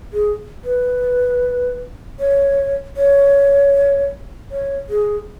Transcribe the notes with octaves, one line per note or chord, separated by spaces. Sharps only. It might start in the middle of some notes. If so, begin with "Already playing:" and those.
G#4
B4
C#5
C#5
C#5
G#4